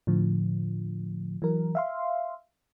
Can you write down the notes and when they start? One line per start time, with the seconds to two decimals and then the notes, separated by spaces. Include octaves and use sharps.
0.07 A2 D3 F3
1.42 E3 F#3 A#4
1.75 E5 F5 C6